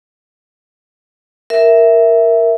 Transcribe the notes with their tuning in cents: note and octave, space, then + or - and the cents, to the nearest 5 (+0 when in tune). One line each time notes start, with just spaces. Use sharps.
A#4 +0 E5 +0